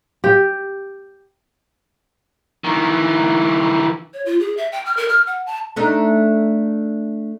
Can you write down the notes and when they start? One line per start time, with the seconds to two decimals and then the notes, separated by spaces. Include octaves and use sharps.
0.24 G4
2.64 D#3 E3
4.14 C#5
4.26 F4
4.40 G#4
4.57 E5
4.72 G5
4.85 F6
4.97 A#4
5.09 F6
5.27 F#5
5.46 A5
5.76 A3 D4 D#4